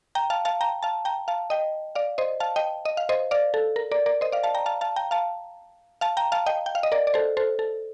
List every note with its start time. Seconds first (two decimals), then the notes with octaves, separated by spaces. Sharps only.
0.15 G5 A#5
0.30 F5 A5
0.45 F5 A5
0.61 G5 A#5
0.83 F5 A5
1.05 G5 A#5
1.28 F5 A5
1.50 D#5 G5
1.95 D5 F5
2.18 C5 D#5
2.40 F5 A5
2.56 D#5 G5
2.85 D#5
2.97 F5
3.09 C5 D#5
3.31 D5 F5
3.54 A4
3.76 A#4
3.91 A#4 D5
4.06 A#4 D5
4.21 C5 D#5
4.32 D5 F5
4.44 F5 A5
4.55 G5 A#5
4.66 F5 A5
4.81 F5 A5
4.96 G5 A#5
5.11 F5 A5
6.01 F5 A5
6.17 G5 A#5
6.32 F5 A5
6.46 D#5 G5
6.66 G5
6.75 F5
6.83 D#5
6.92 A#4 D5
7.07 D5
7.14 A4 C5
7.37 A4 C5
7.59 A4